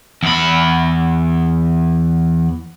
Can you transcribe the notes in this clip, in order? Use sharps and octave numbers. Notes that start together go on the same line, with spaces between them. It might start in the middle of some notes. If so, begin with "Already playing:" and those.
E2 B5